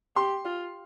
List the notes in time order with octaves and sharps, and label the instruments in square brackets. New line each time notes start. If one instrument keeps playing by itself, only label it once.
[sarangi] G4 [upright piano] C6
[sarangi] F4